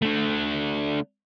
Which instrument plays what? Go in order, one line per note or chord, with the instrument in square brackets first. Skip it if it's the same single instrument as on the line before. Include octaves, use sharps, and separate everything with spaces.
[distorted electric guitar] D3 A3